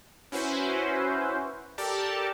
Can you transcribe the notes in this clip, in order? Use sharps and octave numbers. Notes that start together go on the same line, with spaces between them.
C#4 E4 F#4 B4 C5
G4 A4 A#4 D5 A5